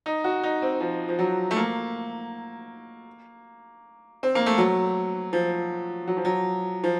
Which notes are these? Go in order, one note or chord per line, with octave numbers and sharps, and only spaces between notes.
D#4
F#4
D#4
C4
F3
F3
F#3
A3
A#3
C4
A#3
A3
F#3
F3
F#3
F3
F#3
F3